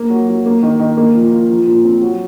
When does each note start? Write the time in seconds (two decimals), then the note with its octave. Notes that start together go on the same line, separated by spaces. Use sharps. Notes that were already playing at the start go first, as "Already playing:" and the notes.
Already playing: A#3
0.10 F#3
0.29 F#3
0.46 A#3
0.63 D#3
0.79 D#3
0.97 A#3
1.15 F3
1.32 F4
1.50 F3
1.67 A#2
1.85 C4
2.01 F#3